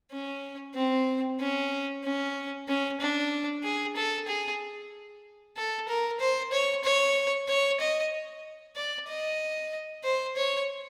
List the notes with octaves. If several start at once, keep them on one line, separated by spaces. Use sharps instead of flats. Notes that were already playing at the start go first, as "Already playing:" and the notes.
C#4
C4
C#4
C#4
C#4
D4
G#4
A4
G#4
A4
A#4
C5
C#5
C#5
C#5
D#5
D5
D#5
C5
C#5